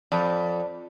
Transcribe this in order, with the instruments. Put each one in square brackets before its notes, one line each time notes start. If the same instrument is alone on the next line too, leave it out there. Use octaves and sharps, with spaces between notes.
[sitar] F2 [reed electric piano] D5 A5 B5